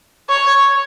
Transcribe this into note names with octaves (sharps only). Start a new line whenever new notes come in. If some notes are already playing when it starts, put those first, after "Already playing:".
C#5